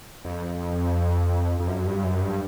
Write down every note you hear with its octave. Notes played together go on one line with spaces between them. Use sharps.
F2
F2
F#2
G2
F#2
G2